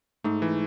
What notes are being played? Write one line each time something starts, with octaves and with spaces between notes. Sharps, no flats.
G#2 A3
E3